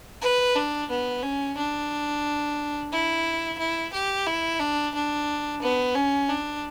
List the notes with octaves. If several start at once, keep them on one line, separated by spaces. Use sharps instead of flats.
B4
D4
B3
C#4
D4
E4
E4
G4
E4
D4
D4
B3
C#4
D4